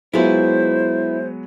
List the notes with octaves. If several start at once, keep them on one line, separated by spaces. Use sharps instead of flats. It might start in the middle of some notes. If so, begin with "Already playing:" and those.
F#3 G#3 B3 E4 F4 C5